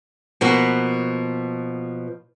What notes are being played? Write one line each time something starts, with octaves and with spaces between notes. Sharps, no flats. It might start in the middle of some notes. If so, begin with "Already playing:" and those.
B2 F3 A#3 B3 F#4